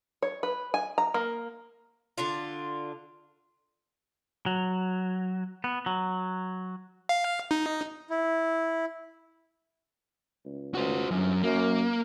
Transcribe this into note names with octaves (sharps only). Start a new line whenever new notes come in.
C#5
B4
G#5
A#5
A#3
D3 D4 F4
F#3
B3
F#3
F5
D#4
E4
C#2
C#2 F#4 C5
G1 F#2
F#2 A#3